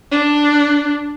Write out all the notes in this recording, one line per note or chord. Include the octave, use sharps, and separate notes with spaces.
D4